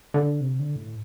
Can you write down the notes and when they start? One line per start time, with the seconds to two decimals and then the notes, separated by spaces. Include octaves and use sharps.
0.14 D3
0.41 C3
0.59 D3
0.76 A2